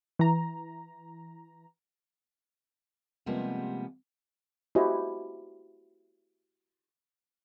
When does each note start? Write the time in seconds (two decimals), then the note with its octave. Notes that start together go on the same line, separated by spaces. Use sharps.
0.19 E3 A#5
3.26 C3 F3 G3 G#3 A#3 B3
4.75 E4 F#4 G4 C5 D#5 G#5